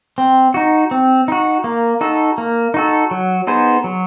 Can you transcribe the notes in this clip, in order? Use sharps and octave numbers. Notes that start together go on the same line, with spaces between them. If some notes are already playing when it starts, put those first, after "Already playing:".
C4
D#4 F#4
C4
D#4 F#4
A#3
D#4 F#4 A4
A#3
D#4 F#4 A4
F#3
B3 D#4 G#4 C5
F#3